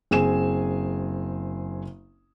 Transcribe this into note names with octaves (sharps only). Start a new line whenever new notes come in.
F#1 C4 G#4 G#5 E7